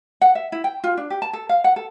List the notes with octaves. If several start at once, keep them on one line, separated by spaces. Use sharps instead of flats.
F#5
E5
E4
G5
F4
D4
G4
A5
A4
F5
F#5
A4